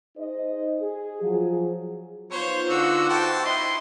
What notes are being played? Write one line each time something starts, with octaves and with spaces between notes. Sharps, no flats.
D#4 G#4 C5 D#5
G#4
F3 F#3 F4 F#4 G#4
B3 D#4 F4 C5 C#5
D3 F#4 E6
C5 G5 A5
E4 D#5 C6